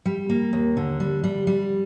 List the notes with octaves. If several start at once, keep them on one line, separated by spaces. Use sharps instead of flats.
G3
A#3
D#2
D3
G3
G3
G3